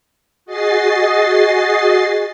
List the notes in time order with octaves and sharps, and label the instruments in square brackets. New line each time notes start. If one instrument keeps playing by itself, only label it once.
[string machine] F#4 G#4 D#5 A6 C7